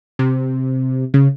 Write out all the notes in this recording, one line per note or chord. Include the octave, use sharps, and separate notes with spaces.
C3
C#3